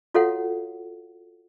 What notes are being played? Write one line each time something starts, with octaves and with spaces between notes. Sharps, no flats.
F4 F#4 A4 C#5 F5 F#5